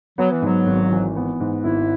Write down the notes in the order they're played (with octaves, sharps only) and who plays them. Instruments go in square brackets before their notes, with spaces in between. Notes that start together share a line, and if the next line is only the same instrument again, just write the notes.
[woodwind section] F#3 [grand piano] B3
[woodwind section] E3
[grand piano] G#2 [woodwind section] F#3
[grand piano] G#1
E3
B3
G#2
[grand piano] G#1 [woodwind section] E4